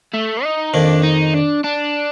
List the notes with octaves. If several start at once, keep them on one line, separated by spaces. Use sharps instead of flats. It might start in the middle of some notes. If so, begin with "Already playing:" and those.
A3
D#4
F2 D#3 A#3 D4
D#4
D4
D4